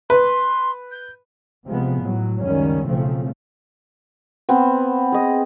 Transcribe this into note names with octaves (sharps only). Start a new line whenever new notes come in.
B4 C6
G6
C3 F3 G#3 B3
A2 F#3
C#2 F#2 D#3 G3 C#4
B1 C#3 F3 A3 C4
B3 C4 F5
G#4 D#5